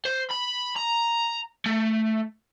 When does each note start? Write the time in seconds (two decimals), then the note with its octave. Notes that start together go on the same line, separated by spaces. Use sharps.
0.05 C5
0.31 B5
0.76 A#5
1.66 A3